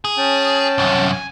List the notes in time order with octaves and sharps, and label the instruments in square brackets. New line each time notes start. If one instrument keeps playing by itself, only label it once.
[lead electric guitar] G#4
[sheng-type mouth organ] C#4 G5 A5
[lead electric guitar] C2 F#2
[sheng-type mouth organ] G#5